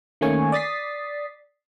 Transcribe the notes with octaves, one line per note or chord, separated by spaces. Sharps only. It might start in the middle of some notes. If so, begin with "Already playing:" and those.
D#3 A3 A#3 C#4 G#5 C#6
D5 D#6 A6 B6 C7